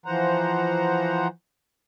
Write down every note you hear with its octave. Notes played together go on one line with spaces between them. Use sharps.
E3 F3 C5 F#5 A#5